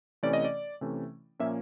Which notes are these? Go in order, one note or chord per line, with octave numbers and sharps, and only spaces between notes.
C3 E3 A3 C#4 D5
D#5
D5
C3 E3 A3 C#4
A#2 F3 A#3 C#4 E5